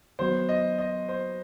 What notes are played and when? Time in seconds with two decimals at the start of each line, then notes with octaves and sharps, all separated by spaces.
0.19 D#3 F#3 B3 F#4 C5
0.49 D#5
0.79 D#5
1.09 C5